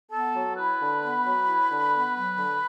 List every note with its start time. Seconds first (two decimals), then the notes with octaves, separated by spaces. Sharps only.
0.11 B3 A4 A5
0.34 F#3
0.56 E4 B4 B5
0.79 D3
1.02 B3
1.24 F#3
1.46 E4
1.68 D3
1.91 B3
2.13 F#3
2.36 D3